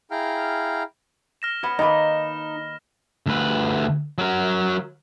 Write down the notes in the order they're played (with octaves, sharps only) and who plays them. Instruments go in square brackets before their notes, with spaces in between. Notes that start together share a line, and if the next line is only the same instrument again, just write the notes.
[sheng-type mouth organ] E4 G#4 F5 G5 A#5 F6
[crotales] F6 A#6 E7
[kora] B3 B4 C#5
[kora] D#3 A#3 B4 [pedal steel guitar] D#4 [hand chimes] D#5 B5
[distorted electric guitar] D2 B4
F#3 A#4